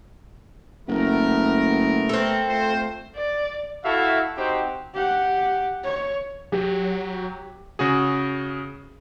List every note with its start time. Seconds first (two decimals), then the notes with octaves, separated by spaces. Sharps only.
0.88 F#1 A3 B3 A#4
2.09 C4 A4
2.48 A3 F4 C5
3.16 D5
3.84 E4 F#4 A4 E5 F5
4.37 C4 D#4 F#4 G4 C5
4.94 G4 F#5
5.84 C#5
6.52 F#3 G4
7.79 C#3 F#4 G#4